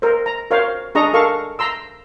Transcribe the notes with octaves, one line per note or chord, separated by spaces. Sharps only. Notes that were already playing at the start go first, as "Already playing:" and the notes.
A#4 C5
A#5
A#4 C5 C#5 F5
D4 G#4 D#5 A#5 C#6
A4 A#4 F5 C#6
A#5 C6 E6